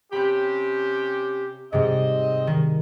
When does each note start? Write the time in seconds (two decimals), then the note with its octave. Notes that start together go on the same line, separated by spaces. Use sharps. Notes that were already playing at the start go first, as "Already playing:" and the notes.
0.13 C3 C#4 G4 B5 G6
1.73 G#2 C3 G3 C4 D#5
2.47 D#3